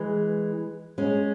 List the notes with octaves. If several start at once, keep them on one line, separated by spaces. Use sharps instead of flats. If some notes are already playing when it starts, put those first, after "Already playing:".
Already playing: E3 G#3
G#3 C#4